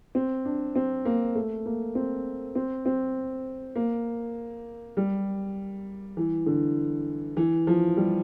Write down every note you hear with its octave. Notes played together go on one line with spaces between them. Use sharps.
C4
D4
C4
A#3
A3
A#3
C4
C4
C4
A#3
G3
E3
D3
E3
F3
G3